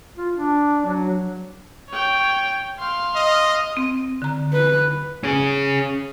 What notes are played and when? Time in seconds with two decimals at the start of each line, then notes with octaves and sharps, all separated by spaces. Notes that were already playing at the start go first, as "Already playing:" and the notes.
0.17 F4
0.36 D4
0.85 F#3
1.90 C#5 G5
2.79 F5 C6
3.16 D#5
3.77 C4
4.22 D3 A#5
4.52 B4
5.24 C#4 G#4